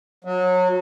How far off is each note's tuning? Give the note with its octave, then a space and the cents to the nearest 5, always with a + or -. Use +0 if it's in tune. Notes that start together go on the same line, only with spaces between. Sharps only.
F#3 -25